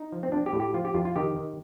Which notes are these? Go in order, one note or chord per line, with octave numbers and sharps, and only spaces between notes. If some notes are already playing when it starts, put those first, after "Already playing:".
Already playing: D#4
F3
C4
F3 D4
G4
A2
G4
F3 F4
G4
F2 F4
F4
D#3 G4
D#3